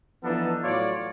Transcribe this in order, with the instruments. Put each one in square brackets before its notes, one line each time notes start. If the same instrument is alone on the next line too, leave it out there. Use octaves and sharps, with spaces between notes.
[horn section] E3 F3 B3 D4 D#4 A4
A2 F#3 F4 C#5 D5